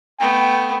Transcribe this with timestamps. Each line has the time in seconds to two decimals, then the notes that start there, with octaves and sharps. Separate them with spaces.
0.19 A3 B3 G5